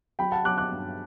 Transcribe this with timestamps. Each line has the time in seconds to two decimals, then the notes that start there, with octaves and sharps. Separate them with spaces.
0.19 F#3 G5 B5
0.32 F#5 A5
0.45 F#3 D6 F#6
0.58 D6 F#6
0.72 G2